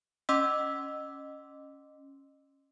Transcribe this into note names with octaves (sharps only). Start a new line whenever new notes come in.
C#4 D#5 C6 D6 E6 B6